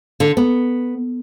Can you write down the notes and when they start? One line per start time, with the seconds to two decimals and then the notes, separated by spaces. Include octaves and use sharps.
0.20 D3
0.37 B3